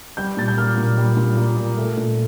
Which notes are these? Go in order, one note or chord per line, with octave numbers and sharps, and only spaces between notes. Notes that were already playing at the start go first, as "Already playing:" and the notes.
G3 G6
A#2 A6
G6
A#3 F6
A#2
G3
A#2
A#3
A#2
A3
A#2